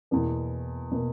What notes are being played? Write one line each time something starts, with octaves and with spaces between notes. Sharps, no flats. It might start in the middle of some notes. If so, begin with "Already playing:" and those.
E2 B2 A#3
B2 A#3